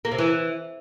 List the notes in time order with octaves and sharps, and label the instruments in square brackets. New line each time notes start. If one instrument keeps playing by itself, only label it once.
[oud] A#3
C3
E3